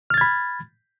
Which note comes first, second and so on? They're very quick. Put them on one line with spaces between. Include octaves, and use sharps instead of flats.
F6 A6 G#6 B5